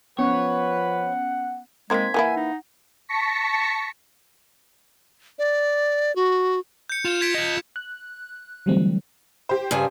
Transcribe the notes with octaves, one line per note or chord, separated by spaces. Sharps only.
F3 B3 C#4 B4 C#5 F#5
G#3 A#3 C4 D#4 G#6 B6
E3 A#3 E4 F#5 G#5
D#4
A5 C#6 A#6 B6 C#7
D5
F#4
G6 C#7
F4 E7
G#6 B6 D7
F4 D#5
F#6
D3 E3 F#3 G3 A3 C4
G4 C5
G2 C#3 G#5